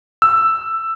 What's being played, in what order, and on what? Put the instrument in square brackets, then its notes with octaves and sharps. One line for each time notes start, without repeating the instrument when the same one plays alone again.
[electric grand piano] E6